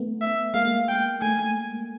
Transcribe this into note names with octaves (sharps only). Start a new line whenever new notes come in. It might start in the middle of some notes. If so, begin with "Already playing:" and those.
Already playing: A3 B3
E5
G#3 A#3 F5
G5
A3 G#5